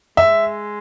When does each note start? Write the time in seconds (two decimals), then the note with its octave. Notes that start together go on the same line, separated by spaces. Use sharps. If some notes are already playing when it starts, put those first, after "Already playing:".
0.17 G#3 E5